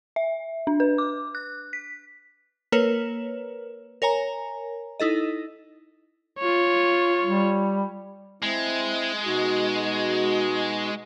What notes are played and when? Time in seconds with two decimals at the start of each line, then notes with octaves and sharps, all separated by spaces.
0.16 E5
0.67 D4
0.80 B4
0.98 D6
1.35 F#6
1.73 B6
2.72 A#3 A#4 B4 C#5 E7
4.02 A#4 C#5 G#5 A#5
5.00 D#4 E4 A4 D#5
6.39 F4 C#5
7.24 G3
8.42 G#3 C4 E4
9.25 B2 D#4 F#4